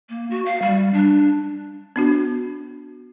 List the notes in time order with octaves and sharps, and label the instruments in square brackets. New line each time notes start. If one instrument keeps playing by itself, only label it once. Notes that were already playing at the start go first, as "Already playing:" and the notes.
[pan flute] A#3
F#4
F5
G3
D4
[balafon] B3 D4 F#4